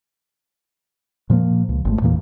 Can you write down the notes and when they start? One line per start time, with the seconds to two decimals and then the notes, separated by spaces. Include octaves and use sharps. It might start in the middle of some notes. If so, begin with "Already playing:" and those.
1.30 A#2 F3 G3 A#3
1.69 C#2
1.85 G#1 G#2 A3
2.02 E2 A#2 E3 A#3